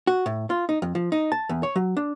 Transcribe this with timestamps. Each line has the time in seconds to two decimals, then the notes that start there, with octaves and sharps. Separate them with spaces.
0.07 F#4
0.26 A2
0.50 F4
0.69 D#4
0.82 F2
0.95 F3
1.12 D#4
1.32 A5
1.49 E2
1.63 C#5
1.76 F#3
1.97 D4